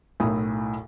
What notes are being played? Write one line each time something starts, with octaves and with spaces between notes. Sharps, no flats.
B1 A2 E4 A#4 D#6